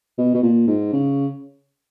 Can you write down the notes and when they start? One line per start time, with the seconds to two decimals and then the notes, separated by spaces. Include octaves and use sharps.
0.18 B2
0.34 B2
0.42 A#2
0.67 G#2
0.92 C#3